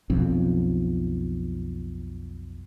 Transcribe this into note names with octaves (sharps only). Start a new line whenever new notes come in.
B1 F2